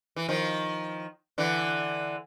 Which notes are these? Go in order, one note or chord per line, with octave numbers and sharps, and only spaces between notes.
E3
D#3 F3
D3 E3